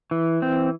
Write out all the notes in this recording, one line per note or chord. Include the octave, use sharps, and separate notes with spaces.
E3
C4